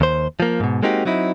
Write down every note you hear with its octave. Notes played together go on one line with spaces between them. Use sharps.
D#2 C5
F3 A#3
G#2 B2
G#3 A#3 C4 D#4 F#4 G4
F#3 C4 D#4 E4